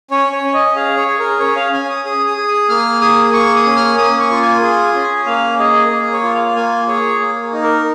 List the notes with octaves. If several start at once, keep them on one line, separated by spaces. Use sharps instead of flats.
C#4 C#5
C#5
C#4
D#5
G#4 F5
C#5
G#4
A#4
C#4 C#5
F5
C#4 G#5
D#6
G#4 D#6
D#6
G#4
D#6
A#3 F6
G#4 D#6
A#3 C#6
D#6
C#4
F6
A#3 D#6
C#6
F4
G#5
G#4
C#4
A#3 F5
G#4 D#5
A#3
C#5
F4
F5
A#3 G#5
G#4 C#5
A#3
D#4
A#4